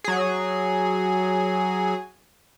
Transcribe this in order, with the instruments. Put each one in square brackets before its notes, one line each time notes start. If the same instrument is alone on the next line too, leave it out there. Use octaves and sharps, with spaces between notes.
[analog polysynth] F#3 G#4